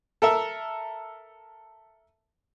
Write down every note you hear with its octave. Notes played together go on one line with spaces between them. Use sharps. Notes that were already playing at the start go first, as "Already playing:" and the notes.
A4 A#4 E5